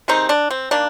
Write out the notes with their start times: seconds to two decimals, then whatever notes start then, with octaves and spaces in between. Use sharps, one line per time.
0.08 C3 D#3 G#3 C4 D#4
0.29 D4
0.50 C4
0.71 D#3 A#3 D4